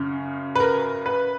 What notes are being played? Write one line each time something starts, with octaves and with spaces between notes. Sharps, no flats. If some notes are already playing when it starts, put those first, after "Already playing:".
Already playing: F#2 C#3
B4
A#4
B4